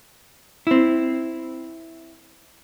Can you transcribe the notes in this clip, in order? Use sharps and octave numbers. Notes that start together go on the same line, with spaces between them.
C4 E4